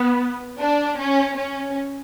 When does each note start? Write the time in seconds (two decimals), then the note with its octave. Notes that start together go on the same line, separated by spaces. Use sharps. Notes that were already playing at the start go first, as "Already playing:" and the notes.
Already playing: B3
0.60 D4
0.98 C#4
1.36 C#4